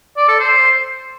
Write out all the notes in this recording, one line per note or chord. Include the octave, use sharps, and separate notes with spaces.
D5
A4
C5